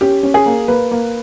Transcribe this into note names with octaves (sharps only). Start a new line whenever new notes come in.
C#4 G4
C#4
G#4
A#3
A#3 B4
A#3